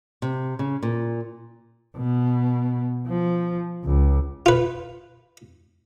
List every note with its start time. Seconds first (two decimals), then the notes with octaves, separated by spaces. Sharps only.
0.22 C3
0.59 C#3
0.83 A#2
1.96 B2
3.08 F3
3.84 C#2
4.46 F4 B4